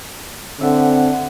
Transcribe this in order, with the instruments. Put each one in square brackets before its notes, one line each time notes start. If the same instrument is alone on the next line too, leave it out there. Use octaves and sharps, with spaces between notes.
[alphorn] D3 [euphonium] C4 [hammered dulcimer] E5 F#5